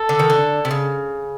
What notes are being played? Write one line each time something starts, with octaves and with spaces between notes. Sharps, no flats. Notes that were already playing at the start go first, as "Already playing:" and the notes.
Already playing: A4
D3
D#3
D3
C3
C#3